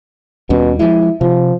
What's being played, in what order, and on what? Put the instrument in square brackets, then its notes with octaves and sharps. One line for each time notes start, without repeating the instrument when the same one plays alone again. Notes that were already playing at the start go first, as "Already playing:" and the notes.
[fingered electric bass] D#2 G3 C#4 [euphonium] B2
[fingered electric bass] F3 G#3 [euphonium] E4
[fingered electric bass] C3 [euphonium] F3